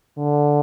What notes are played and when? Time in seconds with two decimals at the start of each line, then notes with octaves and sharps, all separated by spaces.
0.18 D3